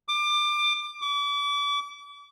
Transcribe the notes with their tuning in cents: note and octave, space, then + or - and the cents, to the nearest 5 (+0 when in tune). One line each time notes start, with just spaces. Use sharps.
D6 +25
D6 -35